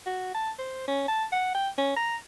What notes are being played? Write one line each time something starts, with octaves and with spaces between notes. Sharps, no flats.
F#4
A5
C5
C#4
A5
F#5
G5
C#4
A#5